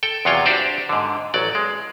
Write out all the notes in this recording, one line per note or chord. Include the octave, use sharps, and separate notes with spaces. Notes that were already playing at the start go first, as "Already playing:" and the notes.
A4 G5
E2 C3 F#3 F4 C#5 G5
D4 F#4 G4 C5 D5
G#2 D3
A1 F#3 D5
G#3